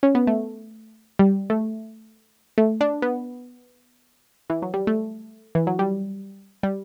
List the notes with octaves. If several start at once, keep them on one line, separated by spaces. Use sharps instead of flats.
C#4
B3
A3
G3
A3
A3
D4
B3
E3
F#3
G3
A3
E3
F#3
G3
G3